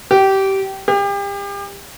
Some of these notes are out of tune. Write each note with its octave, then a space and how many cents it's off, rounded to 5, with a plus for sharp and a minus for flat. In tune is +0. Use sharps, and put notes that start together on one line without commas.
G4 -20
G4 +35